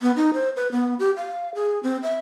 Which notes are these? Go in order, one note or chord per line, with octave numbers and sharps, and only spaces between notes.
B3
D#4
C5
B4
B3
G4
F5
G#4
C4
E5